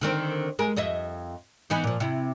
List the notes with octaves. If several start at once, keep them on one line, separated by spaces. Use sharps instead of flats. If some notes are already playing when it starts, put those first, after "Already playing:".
D3 D#3 C4
G#3 A#4
F2 D#5 E5
E3 B3 D#4
A#2 F3
C3 E4